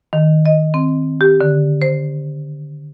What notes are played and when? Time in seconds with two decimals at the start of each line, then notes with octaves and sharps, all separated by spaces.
0.13 D#3
0.46 D#5
0.74 C4
1.21 G4
1.41 D3
1.82 C5